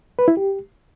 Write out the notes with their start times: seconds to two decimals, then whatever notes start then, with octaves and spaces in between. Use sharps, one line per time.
0.19 B4
0.28 E4
0.37 G4